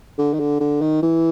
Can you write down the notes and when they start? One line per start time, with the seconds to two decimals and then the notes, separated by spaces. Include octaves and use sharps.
0.18 D3
0.34 D#3
0.40 D3
0.60 D3
0.81 D#3
1.03 E3